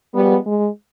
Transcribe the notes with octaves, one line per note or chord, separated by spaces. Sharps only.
F3 G3 G#3 B3
G#3